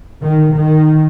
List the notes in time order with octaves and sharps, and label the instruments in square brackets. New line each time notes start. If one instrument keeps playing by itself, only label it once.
[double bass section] D#3
D#3